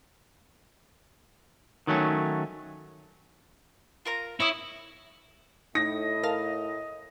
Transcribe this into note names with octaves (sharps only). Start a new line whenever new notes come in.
D#3 F#3 A3 C#4
F4 A#4 A#5
E4 C#5 D#6
A2 D#4 D#5 A#6
A#4 F5 A5